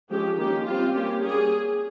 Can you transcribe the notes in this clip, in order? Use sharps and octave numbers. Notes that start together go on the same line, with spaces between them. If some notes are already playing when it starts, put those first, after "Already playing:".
F3 G#3 C#4 G4
D#3 A#3 C#4 G4
G3 C4 F4
G3 A#3 C#4 G4
G3 A#3 C#4 G#4